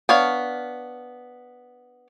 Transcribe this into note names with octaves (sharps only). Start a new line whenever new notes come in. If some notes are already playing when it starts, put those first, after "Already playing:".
B3 D4 C#5 F5